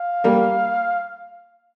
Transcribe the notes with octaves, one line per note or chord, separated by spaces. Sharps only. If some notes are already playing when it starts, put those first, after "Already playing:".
Already playing: F5
G3 A#3